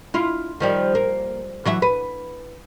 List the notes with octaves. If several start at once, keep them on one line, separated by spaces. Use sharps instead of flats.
E4 F4
D#3 F3 G3
A#3
E3 F#3 E5
B4